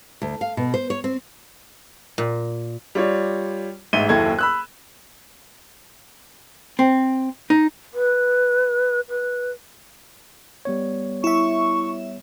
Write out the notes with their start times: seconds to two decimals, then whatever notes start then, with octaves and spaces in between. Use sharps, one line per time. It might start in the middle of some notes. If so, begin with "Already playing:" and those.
0.22 D2
0.41 F5
0.57 B2
0.74 C5
0.90 C#5
1.04 C4
2.18 A#2
2.95 G3 F4 C#5
3.93 A1 G#2 E5 D#7 G7
4.09 F#1 D#2 E4 A4 G#6
4.39 B5 E6 F#6
6.79 C4
7.50 D#4
7.94 B4
9.09 B4
10.65 G3 B3 C#5
11.24 E4 E5 C#6